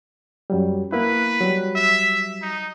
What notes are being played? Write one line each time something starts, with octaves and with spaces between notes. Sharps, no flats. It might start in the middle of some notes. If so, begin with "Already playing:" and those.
F#2 F#3 G3
A#3 B3 E4 B4
F#3 G3
E5
D#4